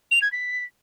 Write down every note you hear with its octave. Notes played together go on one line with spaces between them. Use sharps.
F7
G#6
B6